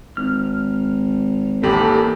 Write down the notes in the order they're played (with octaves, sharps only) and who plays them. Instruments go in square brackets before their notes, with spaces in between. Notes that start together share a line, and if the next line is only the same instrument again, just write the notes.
[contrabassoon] G#1 [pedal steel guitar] F6
[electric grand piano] A1 D#2 G4 [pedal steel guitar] A#3 B5 [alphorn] A4